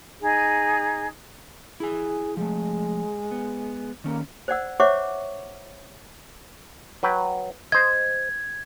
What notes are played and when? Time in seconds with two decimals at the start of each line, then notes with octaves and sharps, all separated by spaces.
0.20 D#4 G#4
1.80 E4 G#4 G#5
2.37 F3 G#3 A3
3.31 B3
4.04 D#3 A#3 C#4
4.48 C5 D5 F#5 E6
4.80 C5 C#5 E5 F#5 C#6 D6
7.03 F#3 B4 G5
7.72 C5 D#5 G#6